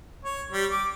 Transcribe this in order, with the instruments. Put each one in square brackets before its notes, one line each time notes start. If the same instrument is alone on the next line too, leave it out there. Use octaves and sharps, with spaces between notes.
[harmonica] C#5
G3
D6